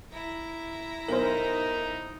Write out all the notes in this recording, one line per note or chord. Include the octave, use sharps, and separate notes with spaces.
E4 A#5
B1 D#4 A#4 C5